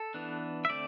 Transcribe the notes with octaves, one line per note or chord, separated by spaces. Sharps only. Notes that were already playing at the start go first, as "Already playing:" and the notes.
Already playing: A4
E3 B3 D4
E5
D3 A3 C4 D5